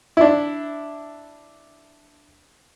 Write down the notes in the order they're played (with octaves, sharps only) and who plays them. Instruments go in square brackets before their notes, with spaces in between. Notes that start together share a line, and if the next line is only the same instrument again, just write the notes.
[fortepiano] D4 E4